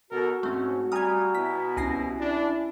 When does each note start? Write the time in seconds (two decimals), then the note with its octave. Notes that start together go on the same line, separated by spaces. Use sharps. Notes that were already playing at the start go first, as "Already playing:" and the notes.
0.11 B2 F#4 A4 A#4
0.43 G#2 A3 C4 C#4
0.92 G3 G#5 A#5 D#6 F6 G#6
1.35 B2 B3 E4 B6
1.77 C2 C#4 G#5 A#6 C7
2.19 D4 E4